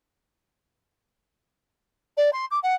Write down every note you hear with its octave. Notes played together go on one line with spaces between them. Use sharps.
D5
C6
D6
F#5